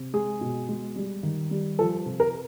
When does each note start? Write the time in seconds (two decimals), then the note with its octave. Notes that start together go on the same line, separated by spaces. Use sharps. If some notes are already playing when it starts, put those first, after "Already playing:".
Already playing: C3
0.14 G#3 G#4
0.41 B2
0.69 G#3
0.96 G3
1.23 D#3
1.51 G3
1.79 F3 A4
2.06 C3
2.20 A#4